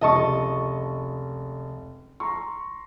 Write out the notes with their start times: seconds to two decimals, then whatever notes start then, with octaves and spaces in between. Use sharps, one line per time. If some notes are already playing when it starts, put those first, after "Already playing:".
0.01 F1 C#2 D#5 A5 C#6
2.20 A#5 C6 C#6